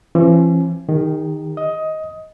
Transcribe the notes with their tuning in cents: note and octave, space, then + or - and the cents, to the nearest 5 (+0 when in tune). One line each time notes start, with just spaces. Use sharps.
E3 +45 C4 +45
D#3 +0 G4 +45
D#5 +15 D#6 +15